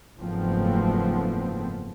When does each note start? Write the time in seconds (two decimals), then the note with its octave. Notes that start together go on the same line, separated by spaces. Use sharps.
0.18 F#1 G#2 F3 A3 B3 C4